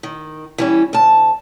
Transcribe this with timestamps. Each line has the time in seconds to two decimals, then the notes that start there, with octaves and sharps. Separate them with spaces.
0.03 D#3
0.58 E3 G3 C#4
0.93 D2 A5